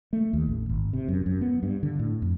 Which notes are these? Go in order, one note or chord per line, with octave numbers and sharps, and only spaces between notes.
A3
D#2
A1
G#1
C3
F#2
F#2
B3
G2
D3
A2
F2